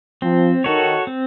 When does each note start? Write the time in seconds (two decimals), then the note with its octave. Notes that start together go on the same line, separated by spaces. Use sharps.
0.22 F3 C4
0.64 D#3 F#4 A4 C#5
1.07 C4